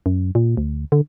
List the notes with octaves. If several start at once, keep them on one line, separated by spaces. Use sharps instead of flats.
F#2
A#2
D2
D3